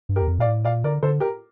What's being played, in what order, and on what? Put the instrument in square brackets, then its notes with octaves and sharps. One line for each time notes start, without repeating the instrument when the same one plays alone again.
[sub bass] G2
[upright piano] G4 A#4
[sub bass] E2
F2
[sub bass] A#2 [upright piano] D5 F5
[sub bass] A2
[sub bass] A#2 [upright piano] D5 F5
[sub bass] D3 [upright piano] A#4 D5
[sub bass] D3 [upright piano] A4 C5
[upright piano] G4 A#4